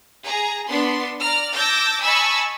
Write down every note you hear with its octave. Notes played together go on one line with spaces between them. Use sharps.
G#4 A#5
B3 D4 C6
D5 A#5 F6
A5 D6 E6 G6 A#6
D#5 G#5 A5 B5 C#6 E6